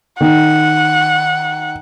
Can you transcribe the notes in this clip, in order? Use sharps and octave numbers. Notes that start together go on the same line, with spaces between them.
D#3 F#5